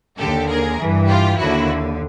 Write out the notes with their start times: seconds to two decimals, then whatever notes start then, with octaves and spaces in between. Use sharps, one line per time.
0.18 D#2 D3 G4 A4
0.48 G#4 A#4
0.78 G2 E3
1.07 F4 G4
1.37 D#2 D3 E4 F#4